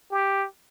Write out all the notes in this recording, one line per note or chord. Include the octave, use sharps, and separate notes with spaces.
G4